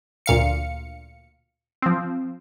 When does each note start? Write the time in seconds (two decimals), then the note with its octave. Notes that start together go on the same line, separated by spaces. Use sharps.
0.26 D2 A#2 F5 C#7
1.82 F3 C4